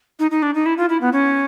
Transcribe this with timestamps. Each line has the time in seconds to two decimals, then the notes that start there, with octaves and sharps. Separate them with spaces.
0.19 D#4
0.31 D#4
0.42 D4
0.54 D#4
0.66 E4
0.77 F4
0.89 E4
1.01 B3
1.13 C#4